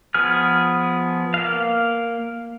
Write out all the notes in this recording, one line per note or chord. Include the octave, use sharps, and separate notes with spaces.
F3 B3 G#4 F6
A#3 F5